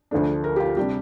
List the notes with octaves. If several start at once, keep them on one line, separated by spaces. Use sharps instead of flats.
D2 D3 F3 A3 D4
A#4
G4
F4
C3 G3 D4 G4